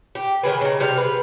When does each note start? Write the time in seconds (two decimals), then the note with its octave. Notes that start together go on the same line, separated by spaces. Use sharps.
0.15 G4
0.43 D#3 F3 G#4 B4
0.61 C#3 D#4
0.80 C3 G3 F5
0.97 B4